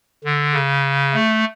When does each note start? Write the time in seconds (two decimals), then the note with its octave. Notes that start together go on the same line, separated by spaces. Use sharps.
0.24 D3
0.54 C#3
1.13 A3